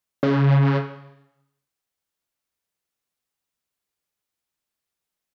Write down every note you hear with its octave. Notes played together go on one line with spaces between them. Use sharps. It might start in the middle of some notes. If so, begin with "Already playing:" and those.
C#3